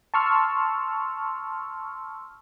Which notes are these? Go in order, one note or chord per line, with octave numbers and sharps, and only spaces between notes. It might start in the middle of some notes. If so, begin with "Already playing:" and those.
A5 C6 C#6 E6 F6